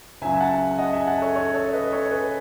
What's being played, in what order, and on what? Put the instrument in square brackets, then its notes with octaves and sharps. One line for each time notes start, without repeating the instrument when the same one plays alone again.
[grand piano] C#2 C#3 F#3 E5 G#5
F#5 A5
D#5 F#5
E5 G#5
F#5 A5
A4 C#5
A4 C#5
A4 C#5
B4 D#5
A4 C#5
G#4 B4